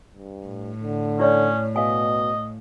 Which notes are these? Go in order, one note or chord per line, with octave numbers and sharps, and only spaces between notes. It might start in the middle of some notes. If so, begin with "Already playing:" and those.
G2
A2
D3
C#4 E4 C#5 D5
B2 D#5 F5 G#5